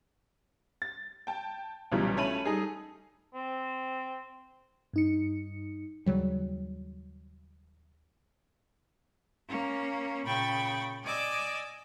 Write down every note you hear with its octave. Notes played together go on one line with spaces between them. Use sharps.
A6
G5 A5
B1 A#2 C#3 E3 G3
A3 C#4 B5 D#7 F#7
G3 D#4 G#4 A4
C4
G2 D#4 C#7
D#2 C#3 F#3 G3
A#3 C#4
A#2 C#3 G5 B5 C#6 A6
D5 D#5 G#5 D6 E6